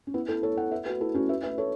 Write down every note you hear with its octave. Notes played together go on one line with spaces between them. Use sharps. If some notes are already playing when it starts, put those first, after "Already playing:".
C#4
B3 E4
E4 A4
A4 C#5
C#5 F#5
B4 E5
F#4 B4
E4 A4
C#4 F#4
B4 E5
B4 E5
A4 C#5